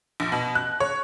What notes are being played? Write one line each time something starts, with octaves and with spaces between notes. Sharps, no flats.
A#1
B2
F#6
C#5